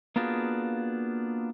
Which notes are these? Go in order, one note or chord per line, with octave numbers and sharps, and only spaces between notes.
A#3 B3 D4 F4 F#4 G#4